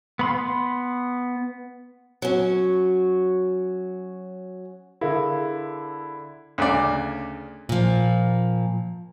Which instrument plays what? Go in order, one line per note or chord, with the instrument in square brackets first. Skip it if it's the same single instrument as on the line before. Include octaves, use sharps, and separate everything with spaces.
[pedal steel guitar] B3 B5 C6
[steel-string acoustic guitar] F#3 C#4
[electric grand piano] D3 E4 [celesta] G#4 A#4 F5
[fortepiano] D2 C#3 D5
[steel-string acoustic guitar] A#2 F3